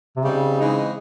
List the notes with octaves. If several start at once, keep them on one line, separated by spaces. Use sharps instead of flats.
C3
C#3 G3 C4 D#4 G4
E3 G#3 C4 D#4